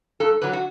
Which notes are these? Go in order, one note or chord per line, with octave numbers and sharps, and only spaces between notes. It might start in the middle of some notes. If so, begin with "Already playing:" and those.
G2 A4
D3 F#3 B4
F#4